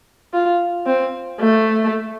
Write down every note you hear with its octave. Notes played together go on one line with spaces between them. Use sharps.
F4
C4
A3